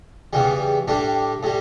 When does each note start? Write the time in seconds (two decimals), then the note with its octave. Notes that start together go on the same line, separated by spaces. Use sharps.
0.33 E2 C#3 E3 G3
0.88 A2 G3 D4
1.43 A2 G3